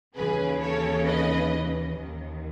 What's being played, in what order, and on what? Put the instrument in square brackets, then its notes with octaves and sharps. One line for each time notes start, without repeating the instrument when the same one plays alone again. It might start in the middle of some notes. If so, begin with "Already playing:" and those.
[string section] D#2 C#3 E3 G#4 B4
A4 C#5
B4 D#5
D#2 D#3